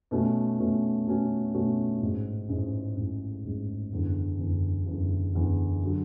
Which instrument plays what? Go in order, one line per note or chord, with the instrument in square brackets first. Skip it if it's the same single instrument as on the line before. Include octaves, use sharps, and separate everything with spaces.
[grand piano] B2 A3 C#4 F#4
B2 A3 C#4 F#4
B2 A3 C#4 F#4
B2 A3 C#4 F#4
A1 G#2 G#3
A1 G#2 G#3
A1 G#2 G#3
A1 G#2 G#3
F#1 E2 D3
F#1 E2 D3
F#1 E2 D3
F#1 E2 D3
D3 F#3